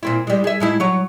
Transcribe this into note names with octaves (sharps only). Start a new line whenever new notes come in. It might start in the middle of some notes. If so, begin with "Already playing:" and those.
A#2 C4 E4
G3 G#3
G#4 E5
A2 G#3 E4
F#3 C#5